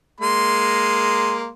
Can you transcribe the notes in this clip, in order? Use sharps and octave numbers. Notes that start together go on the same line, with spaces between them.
G#3 A#3 C6